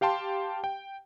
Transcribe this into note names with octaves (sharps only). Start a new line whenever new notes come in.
G4 F5 G5 A5 C6
G5